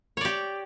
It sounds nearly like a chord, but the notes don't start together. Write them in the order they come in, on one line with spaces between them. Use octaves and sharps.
C#5 D5 G4